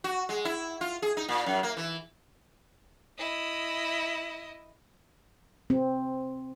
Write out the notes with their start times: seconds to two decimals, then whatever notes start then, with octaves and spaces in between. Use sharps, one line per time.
0.04 F#4
0.29 G#3
0.45 E4
0.81 F4
1.02 G#4
1.17 D#4
1.29 A#2
1.46 F#2
1.63 A#3
1.77 E3
3.18 E4 D#5
5.70 C4